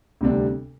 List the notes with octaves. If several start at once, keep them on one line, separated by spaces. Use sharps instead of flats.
D2 C3 G3 D4